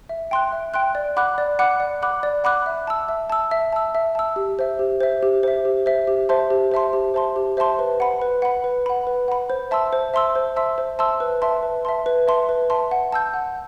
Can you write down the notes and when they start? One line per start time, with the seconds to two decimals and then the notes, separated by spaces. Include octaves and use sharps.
0.09 E5
0.31 G5 C6 F#6
0.52 E5
0.74 G5 C6 F#6
0.95 D5
1.17 F#5 B5 D6 F#6
1.38 D5
1.59 F#5 B5 D6 F#6
1.80 D5
2.02 F#5 B5 D6 F#6
2.23 D5
2.44 F#5 B5 D6 F#6
2.66 E5
2.87 A5 E6
3.09 E5
3.30 A5 E6
3.51 E5
3.73 A5 E6
3.95 E5
4.15 A5 E6
4.36 G4
4.59 C5 E5
4.79 G4
5.00 C5 E5
5.23 G4
5.43 C5 E5
5.65 G4
5.86 C5 E5
6.07 G4
6.29 C5 E5 A5 C6
6.50 G4
6.72 C5 E5 A5 C6
6.93 G4
7.14 C5 E5 A5 C6
7.36 G4
7.57 C5 E5 A5 C6
7.79 B4
8.00 F#5 B5
8.22 B4
8.42 F#5 B5
8.64 B4
8.86 F#5 B5
9.07 B4
9.28 F#5 B5
9.50 C5
9.71 E5 A5 C6 E6
9.93 C5
10.14 E5 A5 C6 E6
10.35 C5
10.56 E5 A5 C6 E6
10.78 C5
10.99 E5 A5 C6 E6
11.20 B4
11.42 E5 A5 C6
11.63 B4
11.85 E5 A5 C6
12.06 B4
12.28 E5 A5 C6
12.49 B4
12.70 E5 A5 C6
12.91 F#5
13.13 A5 E6 G6
13.34 F#5